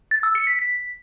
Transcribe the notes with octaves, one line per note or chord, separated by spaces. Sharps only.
A6
E6
C#7
B6
B6